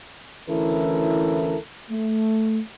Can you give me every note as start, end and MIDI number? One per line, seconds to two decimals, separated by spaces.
0.49 1.57 38
0.49 1.57 52
0.49 1.57 61
0.49 1.57 64
0.49 1.57 69
0.49 1.57 70
1.91 2.60 57